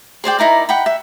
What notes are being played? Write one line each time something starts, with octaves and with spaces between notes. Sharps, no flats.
G#4 C5 D5 G5
D#4 E4 A#4 D5
F#5 G5 B5
E5